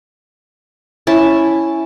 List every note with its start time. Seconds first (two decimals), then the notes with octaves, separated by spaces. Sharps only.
1.07 C#4 E4 A5